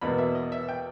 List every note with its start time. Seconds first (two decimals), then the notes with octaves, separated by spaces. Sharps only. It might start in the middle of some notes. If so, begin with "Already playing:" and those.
0.01 E2 B2 A#3 B5
0.18 E5
0.35 D#5
0.52 E5
0.68 G5